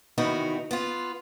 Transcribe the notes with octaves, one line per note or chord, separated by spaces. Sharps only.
E2 C3 D#3 B3 D#4 F#4
B3 F4